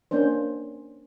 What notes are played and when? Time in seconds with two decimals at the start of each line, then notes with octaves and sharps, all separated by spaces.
0.11 A#3 C#4 D4 C5